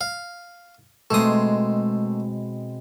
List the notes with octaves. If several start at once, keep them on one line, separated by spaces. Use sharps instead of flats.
F5
B2 G#3 A3 C4 D#6